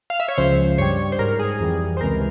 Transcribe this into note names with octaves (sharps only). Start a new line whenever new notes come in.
F5
E5
C#5
C#2 C#3 F3 C5
G2 G3 C#5
C5
G#2 G3 A#4
G#4
F2 E3 G3
C5
C#2 C3 E3 G#3 A#4